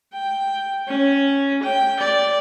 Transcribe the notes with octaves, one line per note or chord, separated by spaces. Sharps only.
G5
C#4
G5
D5